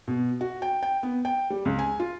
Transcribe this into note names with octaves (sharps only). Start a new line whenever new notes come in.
B2
F#4
G5
G5
B3
G5
G3
C#2
G#5
F4